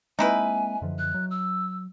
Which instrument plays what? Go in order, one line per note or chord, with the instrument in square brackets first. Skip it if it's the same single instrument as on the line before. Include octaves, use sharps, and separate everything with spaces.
[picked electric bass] G#3 A#3 C4 [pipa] D#4 E4 B4 [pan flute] G#5
[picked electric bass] F#2 D3 F3
[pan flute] F#6
[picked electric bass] F#3
[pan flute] E6